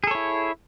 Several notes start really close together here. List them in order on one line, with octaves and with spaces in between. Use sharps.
G#4 A4 C#5 E4